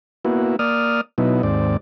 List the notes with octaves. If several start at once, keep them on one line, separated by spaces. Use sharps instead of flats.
A#3 B3 E4 F#4
A#3 D5 D#6 F6
B2 F#3 B3 D#4 E4
D#2 G#2 C4 D5